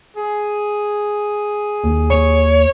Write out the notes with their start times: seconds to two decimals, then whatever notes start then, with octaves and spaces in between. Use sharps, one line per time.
0.16 G#4
1.84 D#2
2.11 C#5